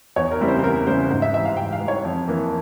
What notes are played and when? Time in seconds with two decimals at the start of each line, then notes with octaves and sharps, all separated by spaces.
0.16 E2 C#5
0.31 A#4
0.40 C#3 G3 C4 E4
0.48 C5
0.59 C5
0.63 E2 A#4
0.87 C#3 G3 C4 E4 C5
1.10 G#2 C5
1.22 E5
1.34 E3 G3 E5
1.45 F5
1.57 G#2 G5
1.72 F5
1.80 E3 G3
1.88 C#5
2.04 F2
2.28 E3 A#3